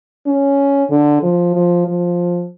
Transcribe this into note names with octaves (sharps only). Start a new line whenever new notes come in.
C#4
D3
F3
F3
F3